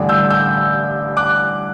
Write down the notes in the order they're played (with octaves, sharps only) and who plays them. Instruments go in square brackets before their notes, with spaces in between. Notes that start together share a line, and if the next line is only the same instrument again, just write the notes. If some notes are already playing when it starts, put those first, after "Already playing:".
Already playing: [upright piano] A1 G2 D3
[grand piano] E6 G6
E6 G6
D6 F#6